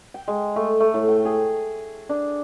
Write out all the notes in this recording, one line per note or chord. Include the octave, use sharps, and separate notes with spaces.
G5
G#3
A3
A3
A2
G5
G#4
D4